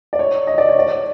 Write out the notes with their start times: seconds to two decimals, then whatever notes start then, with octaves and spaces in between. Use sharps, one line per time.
0.13 D5
0.19 C#5
0.47 D#5
0.58 D5
0.69 C#5
0.79 D5